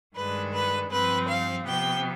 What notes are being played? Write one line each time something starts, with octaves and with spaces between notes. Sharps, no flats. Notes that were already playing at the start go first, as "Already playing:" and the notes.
G2 D#3 G#3 D4 B4
B4
G2 F3 C4 B4
F5
C3 F3 B3 G5